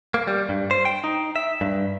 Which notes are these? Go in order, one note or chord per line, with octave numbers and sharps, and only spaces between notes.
A#3
G3
G2
C5
G5
D#4
E5
G2